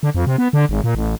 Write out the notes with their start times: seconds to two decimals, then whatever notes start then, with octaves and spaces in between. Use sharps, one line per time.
0.03 D3
0.15 F2
0.27 C3
0.38 B3
0.53 D3
0.69 G#1
0.84 A#2
0.95 A1